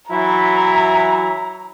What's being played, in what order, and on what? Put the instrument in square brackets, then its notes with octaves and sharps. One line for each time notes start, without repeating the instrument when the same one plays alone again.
[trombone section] E3 F#3 E4 [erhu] A#5